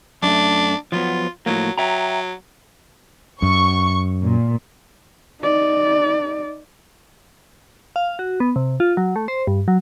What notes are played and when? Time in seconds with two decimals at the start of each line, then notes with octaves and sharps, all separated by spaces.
0.23 F#2 A3 D4
0.92 F3 F#3 B3 F4
1.46 A2 F3 F#3 A#3
1.78 F#3 E5 G5 A#5
3.42 F#2 C#6
4.23 A#2
5.41 D#4 D5
7.96 F5
8.19 F#4
8.40 B3
8.56 C3
8.80 F4
8.97 F#3
9.16 A3
9.28 C5
9.47 G2
9.68 F#3